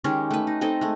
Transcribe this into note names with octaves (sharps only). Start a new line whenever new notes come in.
D#3 G#3 C#4 G4
A3 B4
D#4
C4 D#4 A4 D#5
G#3 A3